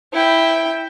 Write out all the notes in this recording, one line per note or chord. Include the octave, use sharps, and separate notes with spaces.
E4 G5